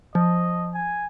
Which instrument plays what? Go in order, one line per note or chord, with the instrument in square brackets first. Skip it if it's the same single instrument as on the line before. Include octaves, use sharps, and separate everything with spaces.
[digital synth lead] F3 [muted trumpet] D#5
[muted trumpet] G#5